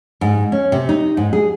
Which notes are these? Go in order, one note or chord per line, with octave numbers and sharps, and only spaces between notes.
G#2
C#4
C3
D#4
G#2
G#4